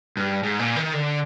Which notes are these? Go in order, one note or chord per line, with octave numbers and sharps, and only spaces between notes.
G2
G#2
A#2
D#3
D3